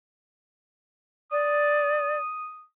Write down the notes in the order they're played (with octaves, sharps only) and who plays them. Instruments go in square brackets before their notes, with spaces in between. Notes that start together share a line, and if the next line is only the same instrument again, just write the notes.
[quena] D5 [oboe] D#6